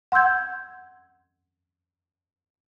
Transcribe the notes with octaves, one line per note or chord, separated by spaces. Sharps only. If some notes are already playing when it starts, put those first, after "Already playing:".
F#5 C6 E6 G6 G#6